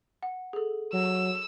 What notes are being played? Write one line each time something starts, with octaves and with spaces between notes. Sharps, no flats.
F#5
G#4 A4
F#3 E6